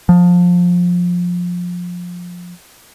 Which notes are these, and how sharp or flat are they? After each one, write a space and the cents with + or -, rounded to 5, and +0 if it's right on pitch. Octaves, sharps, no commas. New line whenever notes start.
F3 +20